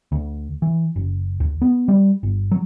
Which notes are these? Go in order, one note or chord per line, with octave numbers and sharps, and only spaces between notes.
D2
E3
F#1
D2
B3
G3
G1
F#3